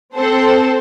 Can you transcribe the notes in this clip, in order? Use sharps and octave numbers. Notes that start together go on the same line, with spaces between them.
C4 A4 C5